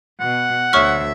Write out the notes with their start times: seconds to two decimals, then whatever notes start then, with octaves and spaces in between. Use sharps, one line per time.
0.20 B2 F#5
0.73 D2 C#5 E5 C#6 F6